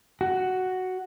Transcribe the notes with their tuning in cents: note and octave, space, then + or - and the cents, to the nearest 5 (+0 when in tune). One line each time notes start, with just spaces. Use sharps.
F#4 +5